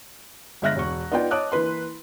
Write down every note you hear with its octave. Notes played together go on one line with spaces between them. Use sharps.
G1 G#3 E5 F6 F#6 A#6
E1 C#6
B3 D#4 F4 D5 G5
C#5 D#5 A5 D6 D#6 F#6
E3 A#3 B4 C6